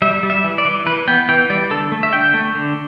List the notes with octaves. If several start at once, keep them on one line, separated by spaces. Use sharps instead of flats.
G3 E5
G3
E5
E3
D5
E3
E3 B4
B3 G5
E3 G5
G3 D5
D3 A4
A3
E5
D3 G5
A3
D3